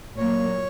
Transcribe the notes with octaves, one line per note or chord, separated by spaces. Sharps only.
A#2 F#3 A#3 C#5